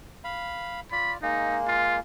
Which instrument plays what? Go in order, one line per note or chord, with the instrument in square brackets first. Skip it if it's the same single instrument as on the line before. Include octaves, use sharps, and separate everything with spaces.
[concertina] F5 B5
[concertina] F4 D5 [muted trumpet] B5
[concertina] G#3 A#3 [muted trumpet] D#4
[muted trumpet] F4